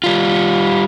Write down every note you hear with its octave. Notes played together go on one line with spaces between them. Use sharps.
G3 F4